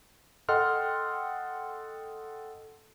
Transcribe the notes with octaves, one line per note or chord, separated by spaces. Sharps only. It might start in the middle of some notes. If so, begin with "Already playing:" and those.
A4 D#5 F#5 G5 C6 F6